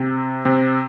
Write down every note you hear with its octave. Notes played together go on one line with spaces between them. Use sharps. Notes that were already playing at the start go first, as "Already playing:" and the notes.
Already playing: C3 C4
C3 C4